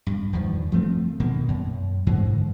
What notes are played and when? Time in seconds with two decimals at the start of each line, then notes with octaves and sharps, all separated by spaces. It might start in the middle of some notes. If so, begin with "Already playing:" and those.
0.07 G2
0.33 E2 G2 D#3 F3
0.72 F3 A3 C4
1.20 B2 D#3 A#3
1.48 F#2
2.07 G#2 D3 E3 G#3